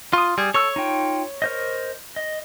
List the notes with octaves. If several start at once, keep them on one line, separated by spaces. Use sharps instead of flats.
F4 C6 D#6
G3 G#4
A4 C#5 C#6 E6
D#4 F4 G5
A#4 C5 D#5
D#5